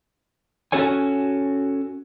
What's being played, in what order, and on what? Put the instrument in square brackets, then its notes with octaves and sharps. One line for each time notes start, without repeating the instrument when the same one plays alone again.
[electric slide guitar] C#4 F#4 A4 C#5 G#5